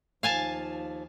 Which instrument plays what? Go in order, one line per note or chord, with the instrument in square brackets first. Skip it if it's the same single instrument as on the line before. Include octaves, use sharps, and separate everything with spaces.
[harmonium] D#2 F3 [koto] F5 G#5 A5